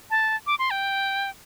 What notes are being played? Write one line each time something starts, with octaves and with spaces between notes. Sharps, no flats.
A5
D6
C6
G5